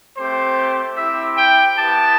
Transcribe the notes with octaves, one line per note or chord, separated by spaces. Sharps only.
A3 C4 G4 C5
C4 E4 G4 E5
G5
B3 E4 G4 A5